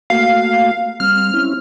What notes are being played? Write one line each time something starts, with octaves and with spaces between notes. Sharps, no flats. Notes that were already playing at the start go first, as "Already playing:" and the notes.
A3 A#3 F#4 F5
G3 C4 F6
C4 C#4 E4